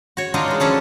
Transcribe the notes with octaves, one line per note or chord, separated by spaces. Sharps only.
F#4 C#5
D4 D#4 F4 F#4 A#4 D#5
E3 G#3
F3 C#4 D4 A4